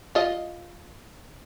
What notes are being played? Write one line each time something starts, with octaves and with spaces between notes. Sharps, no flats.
F4 D#5